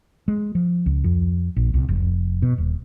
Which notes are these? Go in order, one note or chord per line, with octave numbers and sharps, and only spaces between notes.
G#3
F3
C#2
F2
A#1
C2
F1
B2
D#1